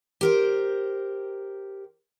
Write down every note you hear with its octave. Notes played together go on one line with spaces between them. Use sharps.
G4 A#4 C5